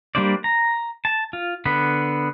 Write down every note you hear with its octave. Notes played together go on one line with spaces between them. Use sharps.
G3 A#3 D4 C5 D5
A#5
A5
F4
D3 B3 B5